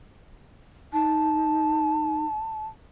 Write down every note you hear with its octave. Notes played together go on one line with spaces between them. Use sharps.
D#4 A5